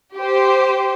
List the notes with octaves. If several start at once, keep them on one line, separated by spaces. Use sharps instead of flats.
G4 C5